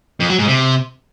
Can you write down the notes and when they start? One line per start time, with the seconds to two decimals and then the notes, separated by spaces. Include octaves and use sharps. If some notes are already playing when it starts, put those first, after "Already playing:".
0.20 F2
0.29 F#3
0.39 G#2
0.48 C3